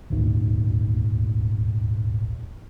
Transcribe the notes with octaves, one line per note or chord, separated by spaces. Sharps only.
D#1 G#1 D2 D#3